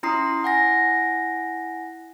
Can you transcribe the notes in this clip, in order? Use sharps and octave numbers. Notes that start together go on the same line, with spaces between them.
C#4 E4 A#5 C6 D#6 C7
E4 F#5 G#5 A#6